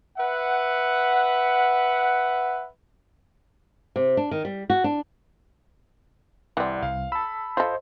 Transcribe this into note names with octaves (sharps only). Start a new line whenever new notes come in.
B4 E5 F#5
C3
D4
D#3
G3
F#4
D4
C2 E3 C4 D5 F#5
C2 F5
A5 B5 E6
F4 A4 C5 D#5